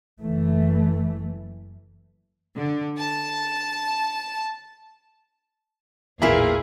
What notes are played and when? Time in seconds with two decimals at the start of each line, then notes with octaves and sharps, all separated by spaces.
0.21 F#1 E3 A3
2.55 D3
2.98 A5
6.22 A1 E2 A#2 A#3 E4 G#4 E5 F5